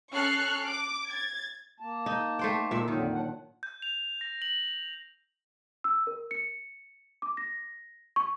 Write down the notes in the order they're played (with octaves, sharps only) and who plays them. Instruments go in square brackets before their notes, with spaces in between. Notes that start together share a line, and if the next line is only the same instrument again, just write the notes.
[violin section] C#4 A4 C#6 F6 F#6 C7
D6
G#6 A6
[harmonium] A#3 A5
[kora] D#4
A3 C5 G5
A#2 E5
[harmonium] F2 D3 F#3 [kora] D#3
[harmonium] F#3 D4 F#5
[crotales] G6
F7
A#6
F#7
[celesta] E6
A#4
C#7
D6
A#6
C#6